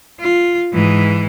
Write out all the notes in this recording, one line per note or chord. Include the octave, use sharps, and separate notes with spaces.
F4
G#2 E3